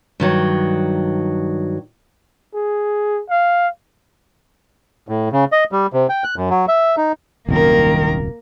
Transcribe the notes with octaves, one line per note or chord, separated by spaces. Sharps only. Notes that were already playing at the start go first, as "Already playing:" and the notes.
G2 D#3 F#3
G#4
F5
A2
C#3
D#5
G3
C3
G5
F#6
F#2
F#3
E5
D#4
D#1 C2 F#2 D#3 A#3 A#4